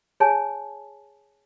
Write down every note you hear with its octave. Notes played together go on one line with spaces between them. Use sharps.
G#4 C#5 G#5 A5